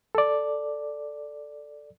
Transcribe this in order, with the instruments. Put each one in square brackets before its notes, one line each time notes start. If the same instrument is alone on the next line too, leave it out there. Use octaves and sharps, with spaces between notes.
[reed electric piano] A4 D5